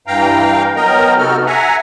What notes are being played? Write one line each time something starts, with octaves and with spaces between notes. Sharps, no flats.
G2 E3 F5 G5 A#5
F#3 B3 A#4 D#5 G5 A#5
C3 B3 D#4 F#4 A4 F6
E5 F#5 G#5 A#5